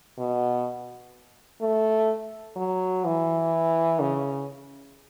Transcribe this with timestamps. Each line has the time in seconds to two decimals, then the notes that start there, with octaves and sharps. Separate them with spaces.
0.18 B2
1.61 A3
2.56 F#3
3.05 E3
4.00 C#3